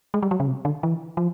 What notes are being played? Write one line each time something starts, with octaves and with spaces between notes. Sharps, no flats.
G#3
G3
F#3
C#3
C3
D3
E3
F3